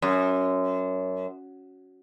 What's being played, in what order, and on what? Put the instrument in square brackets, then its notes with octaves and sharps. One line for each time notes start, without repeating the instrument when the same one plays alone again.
[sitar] F#2